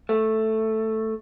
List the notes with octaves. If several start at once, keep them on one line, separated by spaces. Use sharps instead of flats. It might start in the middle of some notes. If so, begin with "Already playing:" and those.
A3